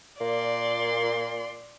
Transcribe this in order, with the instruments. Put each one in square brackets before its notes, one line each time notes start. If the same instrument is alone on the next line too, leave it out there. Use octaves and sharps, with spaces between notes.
[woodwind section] A#2 [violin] D5 C6